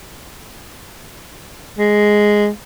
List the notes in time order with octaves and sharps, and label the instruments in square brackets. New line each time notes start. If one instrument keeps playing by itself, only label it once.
[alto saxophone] G#3